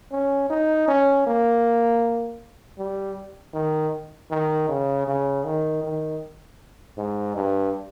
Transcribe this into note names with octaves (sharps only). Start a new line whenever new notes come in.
C#4
D#4
C#4
A#3
G3
D#3
D#3
C#3
C#3
D#3
D#3
G#2
G2